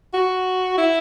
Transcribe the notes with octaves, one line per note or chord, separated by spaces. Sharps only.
F#4
E4